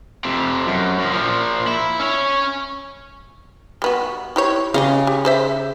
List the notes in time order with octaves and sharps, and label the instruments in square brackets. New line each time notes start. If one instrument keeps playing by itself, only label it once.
[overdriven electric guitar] F2 C3
F#2
F#2 F3
A#2 F3
E4
C#4 C#5
[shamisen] G3 B3 F#4
E4 G4 C#5
[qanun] C#3 [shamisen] G4 D#5 F5
[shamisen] G4
G#4 C5 E5